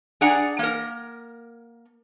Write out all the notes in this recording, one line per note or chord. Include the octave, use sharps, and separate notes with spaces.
D4 G#4 D5 F#5 G#5 A#5
A#3 A#4